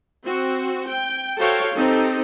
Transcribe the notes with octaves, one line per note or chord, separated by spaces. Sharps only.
C4 F#4
G5
F#4 A4 C5 C#5 F5 G5
C4 D#4 G4 A4